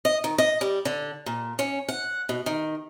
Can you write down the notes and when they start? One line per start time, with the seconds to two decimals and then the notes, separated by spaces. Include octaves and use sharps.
0.05 D#5
0.24 D#3
0.38 D#5
0.61 G3
0.85 D3
1.26 A#2
1.59 C#4
1.89 F#5
2.29 B2
2.46 D#3